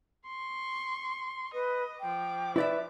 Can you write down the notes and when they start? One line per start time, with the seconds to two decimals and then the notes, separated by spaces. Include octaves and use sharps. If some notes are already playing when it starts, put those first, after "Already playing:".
0.26 C6 C#6
1.54 B4 D#5
2.01 F3 G5 D6
2.56 E4 B4 D5 E5